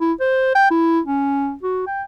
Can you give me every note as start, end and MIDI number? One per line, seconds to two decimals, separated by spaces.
0.01 0.13 64
0.20 0.53 72
0.55 0.68 79
0.71 1.00 64
1.06 1.54 61
1.63 1.84 66
1.87 2.03 79